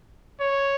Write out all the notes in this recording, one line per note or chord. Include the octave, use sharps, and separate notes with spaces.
C#5